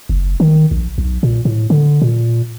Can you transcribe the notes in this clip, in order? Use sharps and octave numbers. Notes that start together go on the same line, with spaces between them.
F#1
D#3
A#1
B1
A#2
A2
D3
A#2